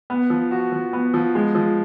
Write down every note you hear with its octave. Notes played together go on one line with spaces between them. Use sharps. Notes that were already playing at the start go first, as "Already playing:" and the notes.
B3
F3
F#4
F3
B3
F3
G#3
F3